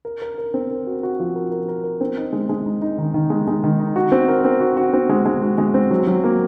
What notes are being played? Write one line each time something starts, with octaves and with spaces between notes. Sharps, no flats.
A#4
A#4
A#4
C4
A#4
F#4
F#4
F3
A#4
A#4
A#4
A#4
C4
D#4
G#3
G#3
D#4
D#4
D#3
D#3
G#3
G#3
D#3
D#4
F#4
C4
A#4
C4
F#4
F#4
C4
G#3
G#3
F#4
G#3
C4
F#3
F#3
A#3